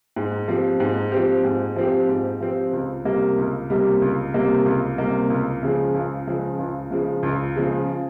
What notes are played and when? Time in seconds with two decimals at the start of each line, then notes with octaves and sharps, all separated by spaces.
0.16 G#2
0.48 F3 C4 G4
0.80 G#2
1.12 F3 C4 G4
1.45 G#2
1.76 F3 C4 G4
2.09 G#2
2.40 F3 C4 G4
2.73 C#2
3.05 C3 G3 A#3
3.38 C#2
3.70 C3 G3 A#3
4.02 C#2
4.34 C3 G3 A#3
4.66 C#2
4.98 C3 G3 A#3
5.30 C#2
5.63 C#3 F3 G#3
5.95 C#2
6.27 C#3 F3 G#3
6.59 C#2
6.91 C#3 F3 G#3
7.23 C#2
7.56 C#3 F3 G#3